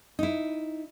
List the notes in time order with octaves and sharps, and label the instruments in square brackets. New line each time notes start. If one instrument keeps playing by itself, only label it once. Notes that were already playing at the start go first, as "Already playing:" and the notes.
[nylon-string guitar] D#4 E4